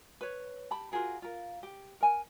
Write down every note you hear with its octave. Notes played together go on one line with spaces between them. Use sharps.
B4 C#5
G4 A5 B5
F4 F#4 G#4 A#4
F4 A#4
G4
A#4 G#5